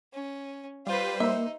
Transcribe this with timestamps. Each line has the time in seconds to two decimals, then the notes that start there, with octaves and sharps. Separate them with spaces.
0.14 C#4
0.87 G3 F4 B4 C5
1.20 A#3 D#4 E5